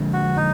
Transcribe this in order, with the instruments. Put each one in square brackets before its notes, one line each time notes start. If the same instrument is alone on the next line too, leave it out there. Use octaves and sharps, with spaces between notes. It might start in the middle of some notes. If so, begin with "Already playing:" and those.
Already playing: [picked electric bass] D3 F3 G#3 D4
[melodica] F#4
D#4